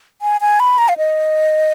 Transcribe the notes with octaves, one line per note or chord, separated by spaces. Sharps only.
G#5
G#5
B5
A#5
F5
D#5